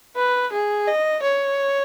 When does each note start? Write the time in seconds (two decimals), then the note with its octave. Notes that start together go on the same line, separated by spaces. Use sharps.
0.16 B4
0.52 G#4
0.87 D#5
1.23 C#5